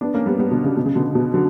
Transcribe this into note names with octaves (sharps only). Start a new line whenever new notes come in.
B3 D4
A#3 C#4
G3 B3
G3 B3
B2 D3
C#3
B2
C#3
B2 D3
B2
D3 F#3